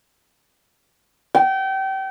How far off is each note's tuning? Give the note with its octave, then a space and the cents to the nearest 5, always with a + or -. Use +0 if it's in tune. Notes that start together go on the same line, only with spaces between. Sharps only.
G5 -30